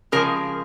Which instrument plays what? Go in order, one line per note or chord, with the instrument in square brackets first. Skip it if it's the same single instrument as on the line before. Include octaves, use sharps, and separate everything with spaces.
[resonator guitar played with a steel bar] C#3 F3 G#3 A#4